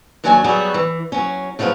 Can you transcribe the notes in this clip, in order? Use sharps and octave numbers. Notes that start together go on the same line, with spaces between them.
D#2 F#3 D4 F#4 G5 G#5
F#3 G3 B3 F#4 G#4
E3
F#3 C#4
C#3 F3 F#3 B3 F4